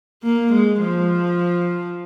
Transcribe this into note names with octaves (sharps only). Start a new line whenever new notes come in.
A#3
G#3
F3